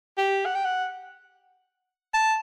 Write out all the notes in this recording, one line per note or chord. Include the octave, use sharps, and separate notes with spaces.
G4
F#5
G5
F#5
A5